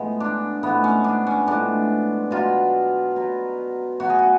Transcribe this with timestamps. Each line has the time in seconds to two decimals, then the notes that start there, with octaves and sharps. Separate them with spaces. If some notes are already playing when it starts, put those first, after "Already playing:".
Already playing: A2 F3 G#3 B3
0.20 D4
0.63 A2 F3 G#3 B3
0.84 C#4
1.04 D4
1.27 C#4
1.47 A2 F3 G#3 D4
2.31 B2 F#3 F4
3.16 B2 F#3
4.00 B2 F#3 F#4
4.10 G#4
4.19 F#4